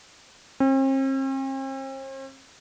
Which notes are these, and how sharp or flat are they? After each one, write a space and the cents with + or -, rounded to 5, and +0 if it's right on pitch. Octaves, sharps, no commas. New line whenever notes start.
C4 +45